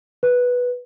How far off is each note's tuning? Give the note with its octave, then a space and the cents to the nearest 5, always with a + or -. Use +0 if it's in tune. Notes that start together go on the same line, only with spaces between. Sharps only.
B4 -5